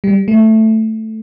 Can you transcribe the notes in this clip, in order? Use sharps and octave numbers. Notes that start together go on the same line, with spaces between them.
G3
A3